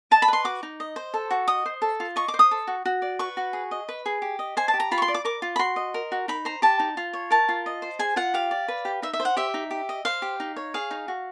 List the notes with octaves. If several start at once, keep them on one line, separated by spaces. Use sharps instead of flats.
D#5 A5
B5
B4 C6
F#4 D6
D#4
D#5
C5
A4
F#4
D#5 D#6
C5
A4
F4
D#5 C#6
D6
C5
D#6
A4
F#4
F#4
D5
B4 C#6
F#4
G#4
D#5
B4
G#4
G4
D#5
C5 G#5
A5
G4
A#5
F4 B5
C#6
C6
D5
D6
A#4 D6
F4
B5
F#4 C6
D#5
A#4
F#4
D#4 B5
C5 A#5
G4 A5
D#4
F4
C#5
A#4 A5
F4
D#5
C5
G#4 G#5
F4 F#5
G4 F5
D5
B4
G4
D#4 E5
E5
C5
F#5
G4 E5
D#4
G4
D#5
C5 F5
G4
D#4
C#5
G#4 F5
D#4
F#4